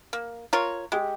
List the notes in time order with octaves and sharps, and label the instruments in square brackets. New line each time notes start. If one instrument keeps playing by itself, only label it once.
[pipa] A#3
F4 A#4 C#5
[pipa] G#3 [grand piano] G4